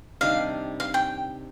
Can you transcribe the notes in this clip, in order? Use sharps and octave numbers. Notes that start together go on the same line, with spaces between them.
C3 D#3 G3 D4 F5
F5
G5